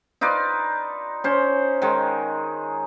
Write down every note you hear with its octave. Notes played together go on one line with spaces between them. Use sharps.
D#4 F4 B4 D5
C#4 C5
D#3 G#3